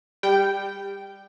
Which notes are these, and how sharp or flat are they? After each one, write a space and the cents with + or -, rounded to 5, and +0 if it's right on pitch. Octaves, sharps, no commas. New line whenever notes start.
G3 +20 G5 -10